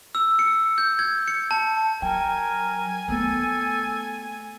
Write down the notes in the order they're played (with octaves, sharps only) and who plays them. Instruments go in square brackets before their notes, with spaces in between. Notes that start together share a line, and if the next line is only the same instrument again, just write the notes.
[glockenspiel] E6
C#7
G6
G#6
C#7
A5
[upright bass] F#3 [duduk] A#4 [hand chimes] G5 [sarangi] G#5
[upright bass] A3 B3 [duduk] A4